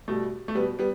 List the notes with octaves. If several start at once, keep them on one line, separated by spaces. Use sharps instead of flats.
B2 G3 A3
A3
B2 G3 B3
G3 B3